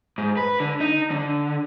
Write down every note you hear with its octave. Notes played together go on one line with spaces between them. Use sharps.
G#2
B4
D3
D#4
D3